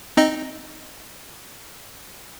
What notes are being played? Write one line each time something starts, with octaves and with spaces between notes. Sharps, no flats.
C4 D#4 D#5